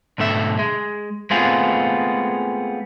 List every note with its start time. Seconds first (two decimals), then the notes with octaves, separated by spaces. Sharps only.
0.18 B1 G#2 D3 A3 E5
0.59 G#3
1.31 G#3 A3 B3 C4 F4 G#4